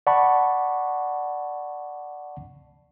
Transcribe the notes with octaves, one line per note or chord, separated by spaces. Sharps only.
D5 F#5 A5 B5 C#6